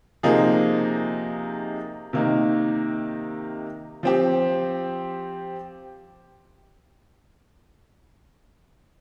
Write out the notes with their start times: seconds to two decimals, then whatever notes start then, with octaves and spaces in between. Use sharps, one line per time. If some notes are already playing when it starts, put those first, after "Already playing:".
0.23 C3 F3 A#3 D#4 G#4
2.13 C3 D#3 A#3 D#4
4.03 F3 C4 G4